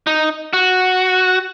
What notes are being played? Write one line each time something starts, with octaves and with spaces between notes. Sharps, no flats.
D#4
F#4